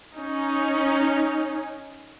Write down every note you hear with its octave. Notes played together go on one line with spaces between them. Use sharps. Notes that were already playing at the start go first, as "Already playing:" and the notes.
C#4 D#4